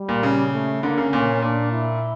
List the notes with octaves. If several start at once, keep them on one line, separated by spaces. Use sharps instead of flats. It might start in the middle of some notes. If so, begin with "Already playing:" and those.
Already playing: G3
A#2
C#3
A3
D3 A#3
C#3
A#2 C#4
A#2 D4
E4